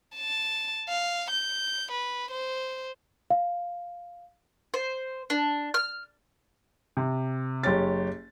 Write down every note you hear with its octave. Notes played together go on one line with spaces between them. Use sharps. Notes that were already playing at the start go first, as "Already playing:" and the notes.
A5
F5
G6
B4
C5
F5
C5
D4
F6
C3
F#1 G4 C#5 A6